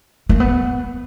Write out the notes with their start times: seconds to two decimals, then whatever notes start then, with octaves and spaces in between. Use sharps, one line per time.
0.29 A#3
0.40 B3